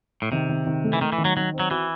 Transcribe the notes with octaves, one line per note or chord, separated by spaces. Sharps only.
A2
C3 D#3
D#3
D#3
A3
E3
D#3 A3
E3
D#3
F#3
D#3 F#3
C4
F#3
E3 F#4